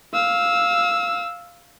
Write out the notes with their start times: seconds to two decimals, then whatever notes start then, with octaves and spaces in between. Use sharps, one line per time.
0.14 F5 E6